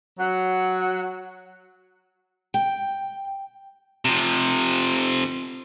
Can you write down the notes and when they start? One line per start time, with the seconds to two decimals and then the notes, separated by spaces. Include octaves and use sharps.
0.19 F#3 F#5
2.54 G5
4.05 C3 F3